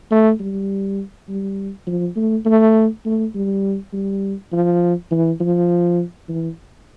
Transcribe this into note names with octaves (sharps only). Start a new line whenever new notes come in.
A3
G3
G3
F3
A3
A3
A3
G3
G3
F3
E3
F3
E3